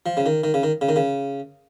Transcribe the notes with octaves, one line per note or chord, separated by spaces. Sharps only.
F3
C#3
D#3
D#3
C#3
D#3
C#3
D#3
C#3